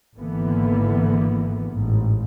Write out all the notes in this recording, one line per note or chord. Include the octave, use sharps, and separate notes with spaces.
G#1 G#2 D3 E3 A#3 B3
A1 G#2